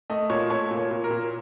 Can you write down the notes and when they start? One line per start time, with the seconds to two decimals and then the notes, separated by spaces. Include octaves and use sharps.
0.10 A3 D#5
0.30 A#2 C#5
0.50 A3 C#5
0.71 A#2
0.77 C#5
0.91 A#2
1.04 A#4
1.11 A#2